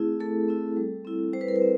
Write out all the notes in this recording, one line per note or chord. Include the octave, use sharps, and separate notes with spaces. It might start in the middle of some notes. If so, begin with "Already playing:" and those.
Already playing: A3 C4 E4 G#4
A3 A4
C4 E4
G3
C4 E4
G3 C5
B4
A#4
B4
C4